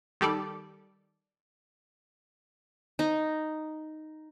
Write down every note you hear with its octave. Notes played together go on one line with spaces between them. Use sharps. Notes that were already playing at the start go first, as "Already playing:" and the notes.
D#3 G3 A4 D5
D#4